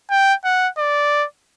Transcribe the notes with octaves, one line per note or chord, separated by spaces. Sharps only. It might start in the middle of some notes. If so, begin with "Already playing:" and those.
G5
F#5
D5